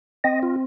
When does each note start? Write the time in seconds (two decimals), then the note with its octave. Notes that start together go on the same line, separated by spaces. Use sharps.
0.24 C4 D#5
0.43 F4